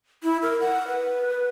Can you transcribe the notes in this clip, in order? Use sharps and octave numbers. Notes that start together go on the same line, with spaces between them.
E4
A#4
F#5
B4